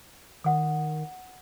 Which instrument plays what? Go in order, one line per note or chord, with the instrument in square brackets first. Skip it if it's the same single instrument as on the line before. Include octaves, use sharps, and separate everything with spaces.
[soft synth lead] D#3 [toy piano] F#5 D#6